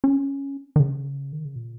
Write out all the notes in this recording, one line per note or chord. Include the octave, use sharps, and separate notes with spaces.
C#4
D#3
C#3
D#3
C#3
A#2